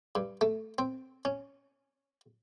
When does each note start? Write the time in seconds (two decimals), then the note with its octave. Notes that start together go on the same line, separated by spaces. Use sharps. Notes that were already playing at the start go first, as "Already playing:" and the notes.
0.15 G2
0.41 A3
0.78 C4
1.25 C#4